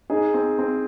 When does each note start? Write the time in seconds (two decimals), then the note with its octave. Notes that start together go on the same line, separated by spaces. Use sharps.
0.10 D#4 G#4
0.34 C4
0.59 C4